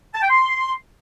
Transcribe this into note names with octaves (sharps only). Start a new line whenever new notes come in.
A5
G5
C6